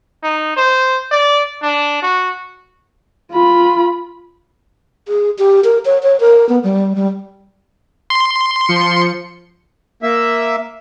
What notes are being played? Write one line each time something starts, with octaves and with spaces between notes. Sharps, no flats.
D#4
C5
D5
D4
F#4
F4 B5
G#4
G4
A#4
C#5
C#5
A#4
B3
G3
G3
C6
F3 C#7
A#3 E5